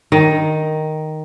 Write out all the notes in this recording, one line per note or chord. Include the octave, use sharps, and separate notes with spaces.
D#3